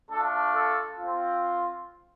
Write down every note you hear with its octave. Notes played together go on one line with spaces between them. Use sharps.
A3 D4 F4 A4
A4
C4 F4